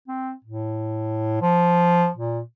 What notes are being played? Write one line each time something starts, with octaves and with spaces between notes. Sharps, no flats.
C4
A2
F3
A#2